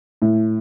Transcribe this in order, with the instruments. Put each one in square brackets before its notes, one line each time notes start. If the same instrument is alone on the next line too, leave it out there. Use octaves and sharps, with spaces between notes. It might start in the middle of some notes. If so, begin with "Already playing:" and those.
[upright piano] A2